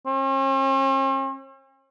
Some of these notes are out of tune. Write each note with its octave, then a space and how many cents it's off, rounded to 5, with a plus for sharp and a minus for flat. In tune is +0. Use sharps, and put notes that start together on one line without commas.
C#4 -45